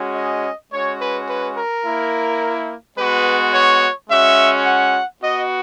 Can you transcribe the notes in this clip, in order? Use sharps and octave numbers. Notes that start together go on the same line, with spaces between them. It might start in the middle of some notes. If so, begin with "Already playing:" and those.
Already playing: G#3 C#4 F#4
D#5
G#3 C#4 F#4 C#5
B4
B4
A#4
A#3 E4
G#3 B3 F#4 B4
C#5
G#3 C#4 F#4 E5
F#5
B3 F#4 D#5